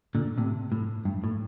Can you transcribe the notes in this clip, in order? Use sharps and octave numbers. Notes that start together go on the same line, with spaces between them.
A#2 D3
A2 C3
A2
G2
A2